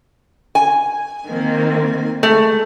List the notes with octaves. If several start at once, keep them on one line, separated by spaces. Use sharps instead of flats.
G#5
D#3 A#3 C4
G#3 A3